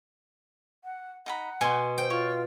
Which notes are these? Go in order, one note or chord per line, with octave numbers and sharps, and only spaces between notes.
F#5
D#4 F#5 A#5 B5
B2 G#5 C6
C5 G5
F4 C#5